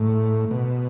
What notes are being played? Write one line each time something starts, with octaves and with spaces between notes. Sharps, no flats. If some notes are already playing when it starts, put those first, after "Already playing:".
Already playing: A2
B2